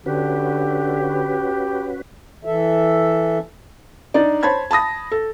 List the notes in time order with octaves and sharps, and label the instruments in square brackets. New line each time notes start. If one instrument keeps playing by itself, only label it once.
[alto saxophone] D3 [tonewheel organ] C#4 F#4 B4 [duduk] G4
[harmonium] E3 A4 E5
[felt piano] D4 D#4 D5
C5 C#5 A5 B5 G#6
A5 B5 D#6 A#6
A4